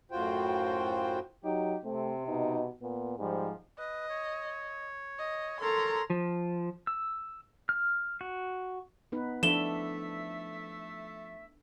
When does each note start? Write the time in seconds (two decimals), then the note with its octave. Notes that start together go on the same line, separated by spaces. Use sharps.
0.11 F#2 A2 F4 F#4 C5 G5
1.45 F#3 D#4 G4
1.85 C3 A3 C4
2.28 B2 D#4
2.82 A#2 B3
3.18 G#2 F3 G3
3.78 B4 D#5
4.09 C#5
5.18 D#5
5.61 A4 A#4 C#5 A#5 C6
6.10 F3
6.87 E6
7.69 F6
8.21 F#4
9.12 B3 D#4 B4
9.43 F3 A3 D4 E4 A4 E5 E7 G7